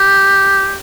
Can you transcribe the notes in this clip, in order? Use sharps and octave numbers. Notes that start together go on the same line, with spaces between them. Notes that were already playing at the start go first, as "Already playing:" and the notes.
Already playing: G4